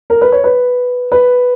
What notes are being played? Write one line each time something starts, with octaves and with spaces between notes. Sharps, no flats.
A#4
B4
C#5
B4
B4